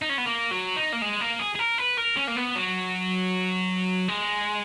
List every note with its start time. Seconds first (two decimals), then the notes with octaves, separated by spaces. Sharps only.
0.02 D#4
0.09 C#4
0.18 B3
0.26 A#3
0.51 F#3
0.76 D#4
0.93 A#3
1.02 G#3
1.21 A#3
1.40 G#4
1.56 G#4
1.59 A#4
1.78 B4
1.98 A#4
2.17 C#4
2.27 A#3
2.36 B3
2.56 F#3
4.08 G#3